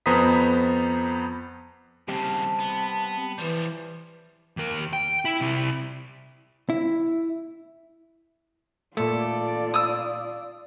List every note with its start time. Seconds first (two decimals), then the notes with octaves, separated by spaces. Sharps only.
0.06 F2 B3 C5 A#5 D#6 B6
2.08 D#2 C#3 G3 C4 G4 A5
2.59 B3
3.38 E3 F3 G3
4.57 D#2 A#4
4.93 G5
5.25 E4
5.41 C3 E4
6.70 E4
8.97 A#2 A3 F4 A4 D5
9.74 D#6 E6